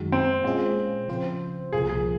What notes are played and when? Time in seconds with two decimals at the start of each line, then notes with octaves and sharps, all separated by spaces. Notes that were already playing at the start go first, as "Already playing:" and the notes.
Already playing: F#2 D#3 G#3 D#4 F#4
0.12 C4
0.44 A#2 G#3 C4 C#4 F4 G#4
1.08 C#3 F3 C4 F4 C5
1.73 C2 A#2 F3 A#3 F4 G#4
1.89 G#4